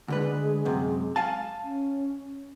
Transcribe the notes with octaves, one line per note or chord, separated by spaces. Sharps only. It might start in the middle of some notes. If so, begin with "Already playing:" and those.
D2 D3 G#3 B4
F#2 C3
F5 G#5 A5
C#4